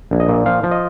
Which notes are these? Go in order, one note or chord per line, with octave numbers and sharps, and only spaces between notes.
A#1
D#5
A#2
F3 F5
F3
D#5